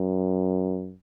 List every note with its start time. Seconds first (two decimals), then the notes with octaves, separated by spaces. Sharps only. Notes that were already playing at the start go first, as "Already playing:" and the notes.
Already playing: F#2